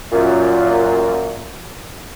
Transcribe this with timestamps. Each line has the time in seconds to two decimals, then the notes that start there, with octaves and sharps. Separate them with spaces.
0.13 F#2 A#2